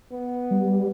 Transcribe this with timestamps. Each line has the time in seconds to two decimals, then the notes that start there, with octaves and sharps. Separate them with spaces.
0.12 B3
0.51 G3